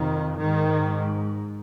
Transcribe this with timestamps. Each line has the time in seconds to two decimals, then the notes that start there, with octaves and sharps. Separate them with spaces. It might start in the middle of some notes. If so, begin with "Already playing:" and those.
Already playing: F2 C3 D#3
0.41 G#2 D#3